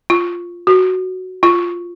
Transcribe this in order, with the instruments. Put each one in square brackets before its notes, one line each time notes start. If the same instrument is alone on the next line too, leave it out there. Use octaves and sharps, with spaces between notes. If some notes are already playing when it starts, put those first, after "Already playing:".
[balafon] F4
F#4
F4